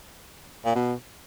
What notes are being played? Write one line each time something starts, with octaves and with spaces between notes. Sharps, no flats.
A#2
B2